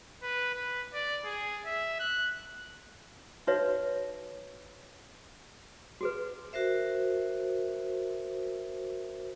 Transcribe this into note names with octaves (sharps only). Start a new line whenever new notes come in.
B4
B4
D5
G#4
E5
F#6
D#4 F#4 B4 C#5 E5
F#4 G#4 B4
F#4 A#4 C5 E5